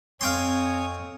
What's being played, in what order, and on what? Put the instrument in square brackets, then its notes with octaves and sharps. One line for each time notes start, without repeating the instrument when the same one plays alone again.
[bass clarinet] F2 [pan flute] C4 [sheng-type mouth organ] C#5 G#5 D#6 [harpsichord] F5 G5 C6